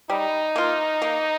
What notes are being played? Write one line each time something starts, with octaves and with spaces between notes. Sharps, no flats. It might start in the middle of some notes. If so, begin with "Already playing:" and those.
G3 D#4
A#3 F4
A#3